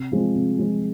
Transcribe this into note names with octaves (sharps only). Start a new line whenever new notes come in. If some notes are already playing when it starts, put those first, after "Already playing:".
Already playing: C3
F3 G#3 C4
C3
F3 G#3 C4